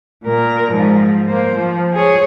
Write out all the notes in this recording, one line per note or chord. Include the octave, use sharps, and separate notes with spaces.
A#2 A#4
G#2 F3
A#3 C5
F3
G#4 C#5